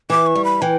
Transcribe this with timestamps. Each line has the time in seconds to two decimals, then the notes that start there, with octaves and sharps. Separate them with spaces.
0.10 E3 D6
0.27 C#6
0.35 G3
0.45 B5
0.62 E3 G5